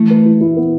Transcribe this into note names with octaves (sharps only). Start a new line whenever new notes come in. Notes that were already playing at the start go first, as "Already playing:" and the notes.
Already playing: E3 A3
B4
E4
E4
B3